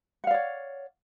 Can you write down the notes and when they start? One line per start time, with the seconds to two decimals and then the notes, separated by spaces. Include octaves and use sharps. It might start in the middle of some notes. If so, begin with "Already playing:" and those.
0.24 F#5
0.27 F5
0.31 D5
0.34 C#5